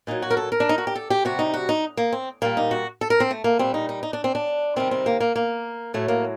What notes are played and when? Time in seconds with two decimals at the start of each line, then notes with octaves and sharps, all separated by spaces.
0.07 A#2 F#3 D#4
0.22 F#4
0.30 A#4
0.37 A4
0.52 A#4
0.60 D4
0.69 D#4
0.78 F#4
0.87 G4
0.95 A4
1.10 G4
1.25 C3 G3 F#4
1.39 D#4
1.54 F#4
1.69 D#4
1.97 A#3
2.13 C4
2.42 A#2 G3 A#3
2.57 D#4
2.71 F#4
3.01 A4
3.10 A#4
3.20 C4
3.31 A3
3.44 A#3
3.59 A#2 G3 C4
3.74 D#4
3.89 D#4
4.03 D#4
4.13 D4
4.24 C4
4.35 D4
4.76 C3 D#3 G3 C4
4.91 C4
5.06 A#3
5.20 A#3
5.36 A#3
5.94 A2 F#3 A3
6.08 A#3